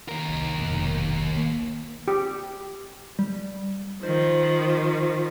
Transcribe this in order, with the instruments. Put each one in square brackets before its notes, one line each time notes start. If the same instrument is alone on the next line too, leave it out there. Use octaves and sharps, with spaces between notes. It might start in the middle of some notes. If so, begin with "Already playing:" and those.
[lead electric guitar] D#2 A#4
[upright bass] C2
F1 B1
D#3 A#3
[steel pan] G4
[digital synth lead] G3
[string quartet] D#3 F3 [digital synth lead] C5